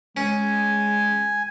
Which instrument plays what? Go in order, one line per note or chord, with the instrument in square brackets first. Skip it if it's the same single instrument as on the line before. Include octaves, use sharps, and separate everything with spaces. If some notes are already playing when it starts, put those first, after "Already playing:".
[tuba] G#3 [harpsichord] C#4 [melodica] G#5